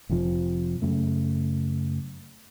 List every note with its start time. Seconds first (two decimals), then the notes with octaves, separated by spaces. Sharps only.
0.09 F1 F2 C3 F3
0.82 F#2 C#3 A3